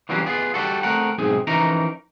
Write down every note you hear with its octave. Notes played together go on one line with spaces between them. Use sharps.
E3 F#3 G3 A#3 C4 C#4
B3 F4 G#4
G3 F#4 A4
A3 C4 A#4 F#5
B1 G#2 C4 G#4
E3 F3 C#4 D#4 A#4 A#5